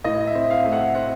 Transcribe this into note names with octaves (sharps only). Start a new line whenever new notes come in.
A2 D#5
E5
C4
F5
A3
F#5
C4 F#5